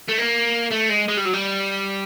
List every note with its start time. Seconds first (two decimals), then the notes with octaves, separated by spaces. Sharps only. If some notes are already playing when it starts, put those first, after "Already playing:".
0.08 A3
0.18 A#3
0.72 A3
0.90 G#3
1.09 G#3
1.17 G3
1.25 F#3
1.34 G3